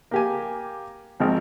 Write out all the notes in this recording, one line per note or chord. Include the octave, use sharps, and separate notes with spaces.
A#3 G4 G#5
G#1 F3 C4